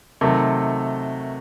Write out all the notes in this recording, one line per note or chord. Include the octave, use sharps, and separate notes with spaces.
C3 D#3 F#3 A3 A4